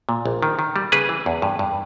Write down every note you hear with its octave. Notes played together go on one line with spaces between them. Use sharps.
A#2
A#1
D#3
D#3
G3
C#3 G#4 B4
E3
E2
G2
G2